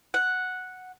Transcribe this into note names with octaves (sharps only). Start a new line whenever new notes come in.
F#5